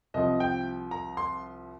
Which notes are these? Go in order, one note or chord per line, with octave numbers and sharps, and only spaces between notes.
C2 C3 F3 D#5
G5
A#5
C6